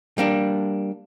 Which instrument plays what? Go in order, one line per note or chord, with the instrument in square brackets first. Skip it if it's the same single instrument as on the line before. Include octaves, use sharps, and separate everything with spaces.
[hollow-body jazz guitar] G3 A#3 D4